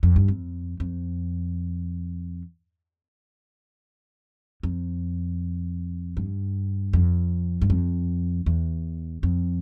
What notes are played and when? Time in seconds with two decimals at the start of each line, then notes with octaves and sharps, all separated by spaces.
0.03 F2
0.16 G2
0.28 F2
0.80 F2
4.63 F2
6.17 G2
6.93 F2
7.62 G2
7.70 F2
8.46 E2
9.23 F2